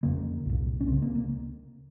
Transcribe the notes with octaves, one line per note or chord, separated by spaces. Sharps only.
F2 C#3 A#3
C2 A#2
C#4
C#2 C#3 C4
A#3
A#3